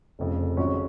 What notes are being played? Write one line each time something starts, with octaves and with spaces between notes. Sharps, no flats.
F1 F2 C#3
G#1 G#2 F#3 C#4 F#4